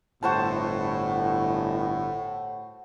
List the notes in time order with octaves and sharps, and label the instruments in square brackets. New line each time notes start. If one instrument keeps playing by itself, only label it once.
[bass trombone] G1 [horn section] A2 [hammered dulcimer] F#4 C5 A5